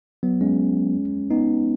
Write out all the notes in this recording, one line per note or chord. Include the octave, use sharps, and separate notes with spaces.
F#3 B3
G#3 C#4
B3 D#4